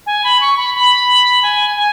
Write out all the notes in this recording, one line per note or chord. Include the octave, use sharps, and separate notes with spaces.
G#5
B5
C#6
B5
B5
G#5
G#5